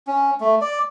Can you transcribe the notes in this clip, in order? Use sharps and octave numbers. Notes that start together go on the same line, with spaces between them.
C#4
A3
D5